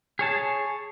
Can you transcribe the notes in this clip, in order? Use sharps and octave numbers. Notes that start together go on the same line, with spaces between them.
G#4 C#5 A5